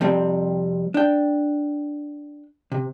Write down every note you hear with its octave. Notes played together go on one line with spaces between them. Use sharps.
F2 C3 G3 C4
D4 G5
C3